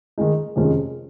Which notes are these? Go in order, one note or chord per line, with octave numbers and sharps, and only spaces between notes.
D#3 G#3 D#4
F2 C3 D#3 G#3 C#4